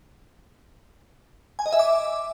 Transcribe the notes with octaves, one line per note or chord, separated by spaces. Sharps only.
G#5
D#5
E5
D6